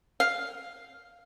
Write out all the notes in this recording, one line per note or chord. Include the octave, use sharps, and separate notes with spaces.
F5